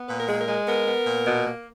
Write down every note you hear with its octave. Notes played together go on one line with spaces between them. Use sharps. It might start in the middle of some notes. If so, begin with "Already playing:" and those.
Already playing: B3
A#2 B4
A#4
G#3 G#4
A#4
G#3
B3 A#4
B3
A#2
B2
A#3